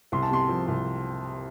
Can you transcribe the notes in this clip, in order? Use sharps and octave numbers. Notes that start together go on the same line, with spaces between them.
C2 C6
A5
C3 C6
F3
C2